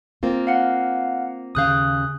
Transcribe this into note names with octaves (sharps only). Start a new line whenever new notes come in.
A#3 C4 F4
F5 F#5
D#2 C#3 F5 D#6 F#6 G6